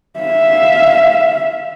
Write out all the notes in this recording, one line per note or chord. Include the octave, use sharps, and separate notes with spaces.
E5 F5